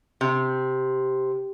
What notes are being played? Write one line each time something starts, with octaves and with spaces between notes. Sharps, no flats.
C3